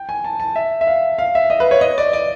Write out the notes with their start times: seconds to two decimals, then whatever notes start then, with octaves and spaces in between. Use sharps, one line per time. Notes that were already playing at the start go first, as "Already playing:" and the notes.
Already playing: G5
0.09 G#5
0.24 A5
0.40 A5
0.55 E5
0.81 E5
0.87 F5
1.18 F5
1.35 E5
1.50 D#5
1.60 B4
1.71 C#5
1.81 D#5
1.98 D5
2.13 D5